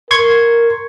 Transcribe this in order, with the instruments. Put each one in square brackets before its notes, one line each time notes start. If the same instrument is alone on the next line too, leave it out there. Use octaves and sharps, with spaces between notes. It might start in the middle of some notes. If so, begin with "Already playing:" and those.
[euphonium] A#4 [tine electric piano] C6 C#6 G#6